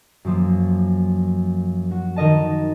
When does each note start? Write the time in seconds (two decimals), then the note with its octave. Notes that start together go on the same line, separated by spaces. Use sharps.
0.25 F#2 F3 A#3
1.91 F#4
2.16 D#3 A#4 D#5 A5